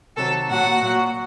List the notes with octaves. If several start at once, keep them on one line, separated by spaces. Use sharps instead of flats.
C3 D#3 F#3 A4 A5
A#2 F#3 F#4 F#5
A#2 F#3